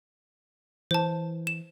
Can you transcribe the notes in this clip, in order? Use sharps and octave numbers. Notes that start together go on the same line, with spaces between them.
E3 C5 A5
E7